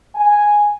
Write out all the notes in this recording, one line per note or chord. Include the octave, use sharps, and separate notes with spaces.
G#5